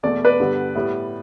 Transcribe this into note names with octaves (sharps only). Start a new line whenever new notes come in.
E2 B2 A3 D5
B4 D5
G2 D3 G3 B3
A2 G3 B3